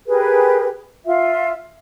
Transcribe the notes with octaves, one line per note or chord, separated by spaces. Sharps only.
G4 G#4 A#4 B4
F4 E5